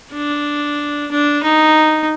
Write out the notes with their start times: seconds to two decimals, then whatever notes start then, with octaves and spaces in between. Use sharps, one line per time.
0.13 D4
1.11 D4
1.43 D#4